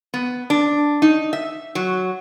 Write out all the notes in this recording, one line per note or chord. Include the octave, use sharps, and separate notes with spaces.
B3
D4
D#4
E5
F#3